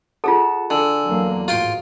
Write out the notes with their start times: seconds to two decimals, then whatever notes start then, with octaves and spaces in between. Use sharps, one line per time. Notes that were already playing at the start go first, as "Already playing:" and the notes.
0.24 F4 G#4 A4 F#5 A5
0.70 D3 D4 G#5 E6
1.04 E2 F#3 A#3
1.48 A1 G#2 F4 F#4 G5 C6